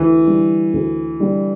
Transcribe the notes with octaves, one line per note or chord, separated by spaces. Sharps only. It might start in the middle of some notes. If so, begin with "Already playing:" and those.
Already playing: D2 E3
D3 G3 D4
D2
D3 G3 D4